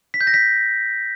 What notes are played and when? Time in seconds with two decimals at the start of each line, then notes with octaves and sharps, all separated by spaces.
0.14 B6
0.21 G6
0.27 A#6
0.34 B6